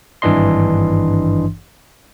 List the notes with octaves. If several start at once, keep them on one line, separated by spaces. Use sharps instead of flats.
G#1 G2 E3 D4 D#5 C6